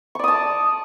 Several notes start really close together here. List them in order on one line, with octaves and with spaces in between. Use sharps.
C#6 D5 D#6 A5